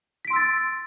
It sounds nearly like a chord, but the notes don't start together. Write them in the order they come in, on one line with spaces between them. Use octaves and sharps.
B6 D7 C6 E6 A6